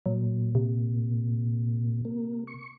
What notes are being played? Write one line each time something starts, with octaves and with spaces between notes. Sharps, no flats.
A#2 F#3
C3
A#3
C#6